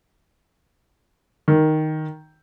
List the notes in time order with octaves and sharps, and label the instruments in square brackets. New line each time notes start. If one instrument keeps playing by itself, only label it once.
[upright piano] D#3